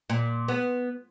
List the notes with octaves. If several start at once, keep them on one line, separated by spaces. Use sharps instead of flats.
A#2
B3